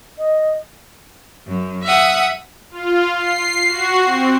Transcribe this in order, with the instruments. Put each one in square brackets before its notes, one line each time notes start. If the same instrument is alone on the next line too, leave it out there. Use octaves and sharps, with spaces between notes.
[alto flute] D#5
[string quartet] F#2
E5 F#5 D#6
[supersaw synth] F4
C7
F#4
C4